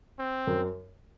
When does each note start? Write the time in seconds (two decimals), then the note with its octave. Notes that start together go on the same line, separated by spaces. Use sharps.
0.19 C4
0.47 F#2